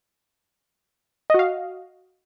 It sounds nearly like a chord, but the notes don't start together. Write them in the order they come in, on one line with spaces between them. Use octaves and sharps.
D#5 F#4 F5